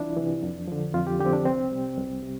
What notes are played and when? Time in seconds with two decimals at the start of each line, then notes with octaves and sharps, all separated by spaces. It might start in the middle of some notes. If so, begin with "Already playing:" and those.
Already playing: C2 C3 E3 D4 E4 F4
0.17 C3 E3
0.42 F2
0.68 D3 F3
0.94 F2 F4
1.07 G4
1.20 D3 G4
1.25 F3 C4
1.33 D4
1.46 C2 C4
1.72 C3 G3
1.98 C2
2.23 C3